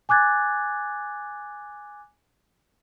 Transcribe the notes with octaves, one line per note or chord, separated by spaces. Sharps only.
G#5 D6 F#6 G#6 A6